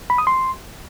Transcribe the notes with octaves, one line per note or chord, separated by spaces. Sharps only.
B5
D#6
C6